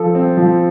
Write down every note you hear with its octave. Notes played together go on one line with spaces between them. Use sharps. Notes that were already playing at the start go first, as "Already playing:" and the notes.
Already playing: F3 A4
C4
F3